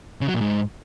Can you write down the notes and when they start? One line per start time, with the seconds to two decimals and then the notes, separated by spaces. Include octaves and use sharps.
0.21 C#3
0.28 F#3
0.34 A#2
0.41 G#2